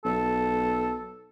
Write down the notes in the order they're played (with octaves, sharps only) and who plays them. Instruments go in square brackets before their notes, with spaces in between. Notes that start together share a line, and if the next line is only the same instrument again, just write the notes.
[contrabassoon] B1 [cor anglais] A4